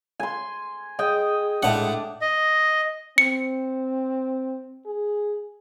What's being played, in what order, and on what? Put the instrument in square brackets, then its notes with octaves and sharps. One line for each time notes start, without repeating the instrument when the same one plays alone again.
[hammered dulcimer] G#5 C6
[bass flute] G#4 [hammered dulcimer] D#5 G5
[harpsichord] A2 F#5 [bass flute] G#3 [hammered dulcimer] D4
[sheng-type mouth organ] D#5
[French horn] C4 [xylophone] C#7
[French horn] G#4